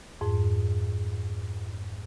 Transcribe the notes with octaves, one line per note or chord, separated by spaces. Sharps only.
F2 G#2